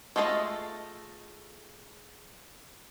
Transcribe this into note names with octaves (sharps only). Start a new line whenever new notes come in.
G#3 A3 F4 A4 D#5